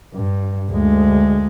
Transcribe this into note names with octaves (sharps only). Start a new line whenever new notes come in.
G2
D2 G#3